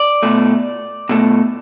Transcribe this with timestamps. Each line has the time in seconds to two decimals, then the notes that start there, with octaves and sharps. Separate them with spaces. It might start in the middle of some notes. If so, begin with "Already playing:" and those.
Already playing: D5
0.23 B2 A3
1.09 B2 A3